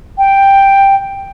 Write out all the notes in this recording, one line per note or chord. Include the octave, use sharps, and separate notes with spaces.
G5